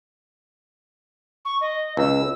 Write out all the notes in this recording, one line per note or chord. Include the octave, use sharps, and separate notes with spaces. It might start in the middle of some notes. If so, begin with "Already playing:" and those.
C#6
D#5
C#2 E6